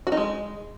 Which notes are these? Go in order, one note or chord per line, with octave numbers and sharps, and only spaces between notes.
F#4
D#4
G#3